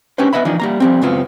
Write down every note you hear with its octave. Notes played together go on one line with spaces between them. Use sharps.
C#4 D4 G4 B4 C5
B3 B4 D#5 E5 B5
E3 F3 D4 D#4
G3 A#3 A#5
F3 G3 C4
C#2 F#2 B3 C4 F4